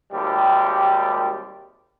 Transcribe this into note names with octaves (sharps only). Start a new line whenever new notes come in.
G#1 D#2 C3 G3